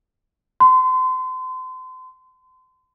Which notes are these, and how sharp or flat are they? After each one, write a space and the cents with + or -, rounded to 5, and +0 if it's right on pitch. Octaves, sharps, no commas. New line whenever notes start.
C6 -35